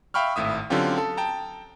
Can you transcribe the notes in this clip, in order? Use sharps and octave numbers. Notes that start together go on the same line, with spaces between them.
E5 F5 G5 B5 C#6 F6
G#1 A2 E5 D#6
D3 F#3 C4 C#4 F4 G4
A4
G5 A5 A#5